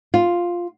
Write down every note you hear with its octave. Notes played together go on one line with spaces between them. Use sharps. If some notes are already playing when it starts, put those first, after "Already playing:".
F4